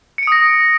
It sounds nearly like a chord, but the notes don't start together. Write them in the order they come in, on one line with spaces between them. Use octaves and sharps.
C#7 D7 D#6 A#6